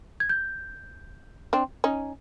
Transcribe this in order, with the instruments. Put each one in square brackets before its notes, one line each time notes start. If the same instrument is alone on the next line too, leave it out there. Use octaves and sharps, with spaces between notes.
[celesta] G#6
G6
[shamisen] C4 D4
C#4 D#4